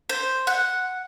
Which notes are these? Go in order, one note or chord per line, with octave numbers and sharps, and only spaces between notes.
C5
F#5